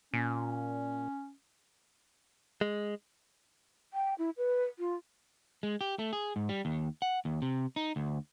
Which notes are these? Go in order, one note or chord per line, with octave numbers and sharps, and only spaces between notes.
A#2 C#4
G#3
G5
E4
B4
F4
G#3
G4
A3
G#4
G#2
G3
D#2
F#5
D#2
C3
D#4
D2